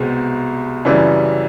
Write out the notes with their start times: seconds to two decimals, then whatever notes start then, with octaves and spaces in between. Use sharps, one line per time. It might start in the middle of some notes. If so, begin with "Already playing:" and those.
Already playing: C2 B2 G#3 C4
0.85 F#2 C#3 E3 G3